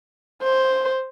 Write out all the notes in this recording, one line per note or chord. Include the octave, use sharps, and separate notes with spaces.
C5